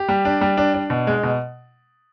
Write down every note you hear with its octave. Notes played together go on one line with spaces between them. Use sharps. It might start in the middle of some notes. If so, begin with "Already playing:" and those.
Already playing: G4
G3
D4
G3
D4
D4
B2
G#3
B2